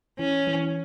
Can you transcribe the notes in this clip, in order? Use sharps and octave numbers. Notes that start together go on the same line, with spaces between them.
E3 C#4
E3